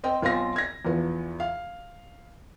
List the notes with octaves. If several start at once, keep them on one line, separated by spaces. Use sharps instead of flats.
C4 D#5 G5
B1 C4 F4 G#5 A#6
G#6 A#6
E2 F3 B3
F5